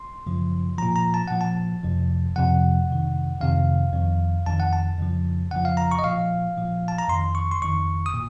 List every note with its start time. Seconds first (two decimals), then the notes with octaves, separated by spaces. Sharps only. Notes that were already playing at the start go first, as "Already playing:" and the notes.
Already playing: C6
0.27 F#2 C#3 F3
0.78 A#2 F3 A#5
0.96 A#5
1.14 A5
1.28 A#2 F3 F#5
1.41 A5
1.84 F2 C3 F3
2.36 F2 C3 F3 F#5
2.89 F2 C3 D#3
3.41 F2 C3 D#3 F5
3.93 F2 D#3
4.46 F2 D#3 A5
4.60 F#5
4.73 A5
4.99 F2 C#3 F3
5.51 F2 C#3 F3 F#5
5.65 F5
5.77 A#5
5.92 C#6
5.99 D#5
6.04 A#2 F3 F5
6.57 A#2 F3
6.88 A5
6.98 A#5
7.08 F2 D#3 C6
7.35 C#6
7.51 C6
7.62 F2 D#3 C#6
8.06 D#6
8.14 A#2